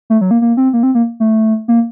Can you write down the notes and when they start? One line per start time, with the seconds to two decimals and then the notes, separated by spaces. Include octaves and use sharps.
0.10 A3
0.21 F#3
0.31 A#3
0.42 A#3
0.57 C4
0.73 A#3
0.83 C4
0.95 A#3
1.20 A3
1.68 A#3